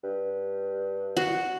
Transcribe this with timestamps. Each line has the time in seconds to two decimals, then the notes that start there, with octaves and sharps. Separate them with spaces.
0.03 G2
1.17 F#4